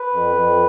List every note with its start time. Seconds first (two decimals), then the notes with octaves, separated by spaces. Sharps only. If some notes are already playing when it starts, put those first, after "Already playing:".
Already playing: B4
0.12 F2
0.35 F2